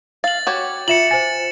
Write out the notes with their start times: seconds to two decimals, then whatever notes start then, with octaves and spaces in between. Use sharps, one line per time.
0.24 F5 A6 F#7
0.47 F#4 G4 C#5
0.88 F4 E5 C#7 E7 F#7
1.11 C5 G#5 A6